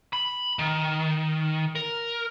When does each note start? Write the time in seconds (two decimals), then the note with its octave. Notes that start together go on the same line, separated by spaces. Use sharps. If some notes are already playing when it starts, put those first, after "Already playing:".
0.13 B5
0.59 D#3
1.75 A#4